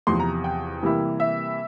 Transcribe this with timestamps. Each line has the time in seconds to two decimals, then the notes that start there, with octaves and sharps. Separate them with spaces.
0.07 E2 C3 F3 C6
0.20 A#5
0.44 G5
0.83 C3 E3 G3 A#3 E4
1.20 E5